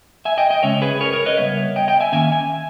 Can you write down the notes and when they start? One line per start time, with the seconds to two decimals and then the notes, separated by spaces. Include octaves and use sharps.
0.25 E5 G#5
0.38 D#5 G5
0.50 D#5 G5
0.63 C#3 G#3 C#4 C#5 E5
0.82 G#4 B4
1.01 A#4 C#5
1.12 A#4 C#5
1.26 B4 D#5
1.37 C#3 G3 B3 C#5 E5
1.76 D#5 G5
1.88 D#5 G5
2.00 E5 G#5
2.12 D#3 A#3 C#4 E5 G#5
2.32 E5 G#5